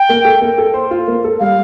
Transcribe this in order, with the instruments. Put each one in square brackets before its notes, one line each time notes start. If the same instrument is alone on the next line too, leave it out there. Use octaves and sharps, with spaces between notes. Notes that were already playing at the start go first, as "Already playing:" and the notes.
Already playing: [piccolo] G5
[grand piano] A#3
A4
A#3
A4
C5
F4
A#3
A4
[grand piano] G3 [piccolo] F5